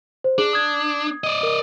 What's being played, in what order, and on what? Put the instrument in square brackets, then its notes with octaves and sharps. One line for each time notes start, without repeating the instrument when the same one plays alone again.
[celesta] C5
[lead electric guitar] D4 [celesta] G#4
[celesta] D#6 G#6
[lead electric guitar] D5 D#5
[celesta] A#4